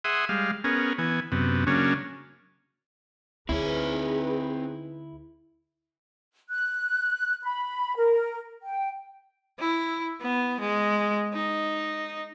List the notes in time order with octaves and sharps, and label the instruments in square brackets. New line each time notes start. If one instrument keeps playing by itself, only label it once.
[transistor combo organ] G#4 E5 F#5 C6 D#6
G3 G#3 F5
B3 C#4 G#4 A#4
E3 B3 G#5
F#2 C3 B3
C#3 F#3 A#3 C#4 D4
[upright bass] D2 [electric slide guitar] C4 C#5 [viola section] D#4 G#4 B4 [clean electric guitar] E4
[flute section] F#6
B5
A#4
G5
[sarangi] E4
B3
G#3
D#4